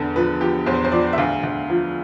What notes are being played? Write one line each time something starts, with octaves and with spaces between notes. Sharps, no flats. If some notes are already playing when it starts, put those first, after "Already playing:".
Already playing: E2 D3 A4
F3 B4
F3 G4
E2 C5
C5
F3 D5
E5
D2 F5
D2
F3